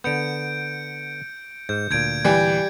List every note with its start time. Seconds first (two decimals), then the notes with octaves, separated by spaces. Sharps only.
0.04 D3 B3 G6 C#7 D7
1.69 G#2 G6
1.91 D2 A#2 G6 G#6 D7
2.25 E3 G3